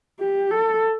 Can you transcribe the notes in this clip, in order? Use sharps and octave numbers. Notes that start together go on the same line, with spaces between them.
G4
A4